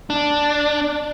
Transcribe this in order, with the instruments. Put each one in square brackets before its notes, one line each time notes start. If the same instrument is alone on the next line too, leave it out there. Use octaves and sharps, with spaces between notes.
[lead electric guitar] D4